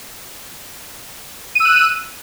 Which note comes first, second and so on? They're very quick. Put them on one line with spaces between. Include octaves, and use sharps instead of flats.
D#7 E6 F#6